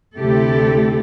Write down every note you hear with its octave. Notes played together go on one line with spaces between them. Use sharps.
D2 C3 A3 E4 G4 A4